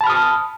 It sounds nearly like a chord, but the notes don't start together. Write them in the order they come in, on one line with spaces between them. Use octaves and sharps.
A5 B5 F6 D#6